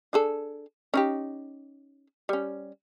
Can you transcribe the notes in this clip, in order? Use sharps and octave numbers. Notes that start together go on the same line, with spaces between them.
D4 G#4 A4
C#4 D#4 G4
G3 C#4